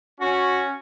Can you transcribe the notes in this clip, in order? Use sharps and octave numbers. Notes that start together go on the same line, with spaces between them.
C#4 F#4